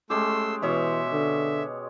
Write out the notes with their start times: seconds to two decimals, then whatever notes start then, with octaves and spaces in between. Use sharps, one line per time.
0.10 G#3 A3 C#4 G4 C6 E6
0.62 B2 E3 C#5 E5 C6
1.13 D3